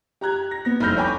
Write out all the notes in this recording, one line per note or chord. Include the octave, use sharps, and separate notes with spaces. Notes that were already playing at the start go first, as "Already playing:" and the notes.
G4 A#5 F#6 G#6
A#6
B3 A#6
F1 C2 B5 F6 G6 A#6
C#5 G5 G#5 B5 D6 A#6